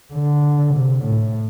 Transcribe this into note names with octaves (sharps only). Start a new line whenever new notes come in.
D3
C3
A2